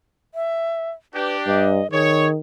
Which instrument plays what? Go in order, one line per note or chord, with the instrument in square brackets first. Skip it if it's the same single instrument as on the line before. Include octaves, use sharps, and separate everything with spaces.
[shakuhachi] E5
[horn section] D4 G4 [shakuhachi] B4
[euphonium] G2 [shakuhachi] D#5
[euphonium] D#3 [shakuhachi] G#4 [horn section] C#5